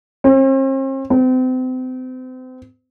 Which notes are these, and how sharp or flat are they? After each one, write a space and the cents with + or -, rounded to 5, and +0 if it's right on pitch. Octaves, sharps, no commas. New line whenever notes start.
C4 +45
C4 -35